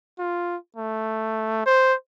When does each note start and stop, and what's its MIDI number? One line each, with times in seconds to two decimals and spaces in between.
0.19 0.56 65
0.77 1.63 57
1.66 1.94 72